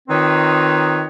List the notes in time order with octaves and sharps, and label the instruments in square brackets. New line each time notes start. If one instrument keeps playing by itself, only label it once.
[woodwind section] D#3 C4 D#4 F4 B4 C#5